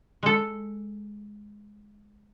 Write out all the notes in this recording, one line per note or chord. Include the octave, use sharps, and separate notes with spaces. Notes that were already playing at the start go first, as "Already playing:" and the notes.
G#3 A4